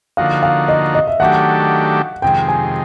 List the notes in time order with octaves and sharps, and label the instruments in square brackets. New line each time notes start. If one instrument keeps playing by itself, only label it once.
[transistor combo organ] D3 F3 A#3 D#4 F#4 [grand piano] F5
[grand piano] F5
D#5
D#5
E5
[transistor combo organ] D#3 F#3 A3 D4 G4 [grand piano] F#5
[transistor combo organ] F2 C3 D#3 G#3 [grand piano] G5
[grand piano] G#5